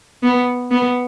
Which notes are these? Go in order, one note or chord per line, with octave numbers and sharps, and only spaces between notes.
B3
B3